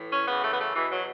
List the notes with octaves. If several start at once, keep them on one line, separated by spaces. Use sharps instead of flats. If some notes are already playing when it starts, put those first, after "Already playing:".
Already playing: A2 E3
C#4
F#2 C#3 E3 B3
A3
B3
A3
E2 B2 E3
F#3